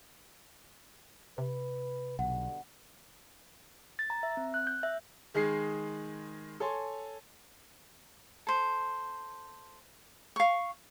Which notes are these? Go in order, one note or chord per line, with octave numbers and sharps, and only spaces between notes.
C3 B4
B1 G2 B2 D3 F#5
A6
A#5
E5
C4
F#6
G6
E5
D#3 G#3 G#4 C7
A4 C#5 G#5 C6
A4 C5
F5 C#6